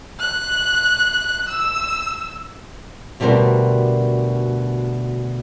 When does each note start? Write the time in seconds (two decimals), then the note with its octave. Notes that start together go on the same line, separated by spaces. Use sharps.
0.19 F#6
1.49 E6
3.20 D2 B2 G3 D4 A#4 C5